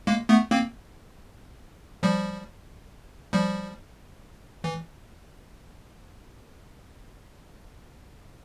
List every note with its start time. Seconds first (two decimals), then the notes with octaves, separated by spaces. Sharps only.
0.07 G#3 A#3
0.29 A3 B3
0.51 A#3 C4
2.03 F3 G3
3.33 F3 G3
4.64 E3